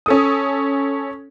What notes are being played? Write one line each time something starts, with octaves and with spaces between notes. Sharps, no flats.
C#4 A4 D#6